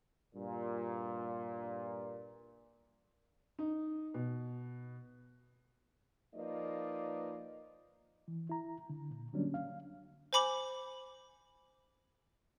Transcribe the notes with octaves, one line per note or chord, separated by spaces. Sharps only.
G2 A#2
D#4
B2
F3 A#3 D#4 B4 D5 D#5
E3
E4 A#5
D3
A#2
D3 F#3 G3 A#3 C#4 D4
F5
C5 G#5 B5 D6 F#7